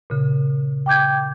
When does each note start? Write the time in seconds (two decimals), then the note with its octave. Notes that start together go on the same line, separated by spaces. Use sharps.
0.10 A#2 C#3
0.86 G5 D6 G6 G#6